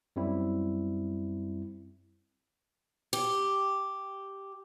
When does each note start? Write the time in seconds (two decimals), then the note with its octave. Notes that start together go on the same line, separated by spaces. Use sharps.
0.16 F#2 G3 C4 E4
3.13 G4